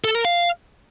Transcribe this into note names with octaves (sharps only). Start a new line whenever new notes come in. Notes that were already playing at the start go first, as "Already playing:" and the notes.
A4
A#4
F5